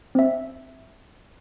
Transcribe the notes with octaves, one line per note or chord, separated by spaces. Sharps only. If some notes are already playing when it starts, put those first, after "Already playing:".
C4 E5